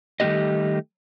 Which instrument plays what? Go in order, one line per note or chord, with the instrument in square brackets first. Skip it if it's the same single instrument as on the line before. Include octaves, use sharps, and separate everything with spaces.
[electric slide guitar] D#3 G3 A3 B3 G4 D#5